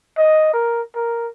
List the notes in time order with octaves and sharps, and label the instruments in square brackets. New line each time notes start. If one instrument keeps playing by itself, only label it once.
[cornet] D#5
A#4
A#4